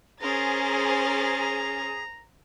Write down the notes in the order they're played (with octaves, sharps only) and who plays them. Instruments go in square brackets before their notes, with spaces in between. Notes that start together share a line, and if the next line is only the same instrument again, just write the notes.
[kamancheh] C#4 [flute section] G#4 [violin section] A#4 C5 A6 [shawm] A#5